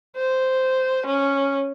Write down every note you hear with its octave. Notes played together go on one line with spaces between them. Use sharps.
C5
C#4